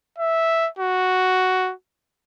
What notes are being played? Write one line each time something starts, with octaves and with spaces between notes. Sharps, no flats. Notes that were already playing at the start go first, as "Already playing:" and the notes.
E5
F#4